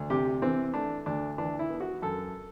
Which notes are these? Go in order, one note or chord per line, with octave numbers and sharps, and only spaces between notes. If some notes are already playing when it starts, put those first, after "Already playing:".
Already playing: D2
C3 G4
E3 C4
A3 D4
D2 D4
E3 D4
E4
B3
F#4
F#2 A4